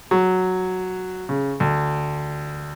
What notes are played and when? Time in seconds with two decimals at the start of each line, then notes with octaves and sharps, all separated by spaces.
0.11 F#3
1.29 C#3
1.60 D2